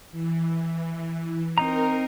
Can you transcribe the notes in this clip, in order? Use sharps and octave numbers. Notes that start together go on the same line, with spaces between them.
E3
C4 D#4 A#4 A#5